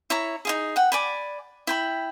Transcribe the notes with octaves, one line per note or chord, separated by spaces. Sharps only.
E4 C#5 A#5
D#4 E4 G#4
F#5 G5
D5 G#5 B5
E4 G5 B5